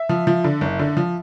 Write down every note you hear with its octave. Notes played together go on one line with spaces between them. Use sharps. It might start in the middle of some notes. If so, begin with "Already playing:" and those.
Already playing: E5
F3
F3
D3
F#1
D3
F3